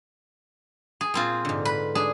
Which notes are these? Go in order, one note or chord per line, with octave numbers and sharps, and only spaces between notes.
G#4
A#2 C4 F4
G#2 D3
B4
D4 G#4